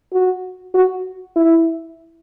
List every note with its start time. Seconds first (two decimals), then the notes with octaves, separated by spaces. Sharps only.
0.13 F#4
0.74 F#4
1.36 E4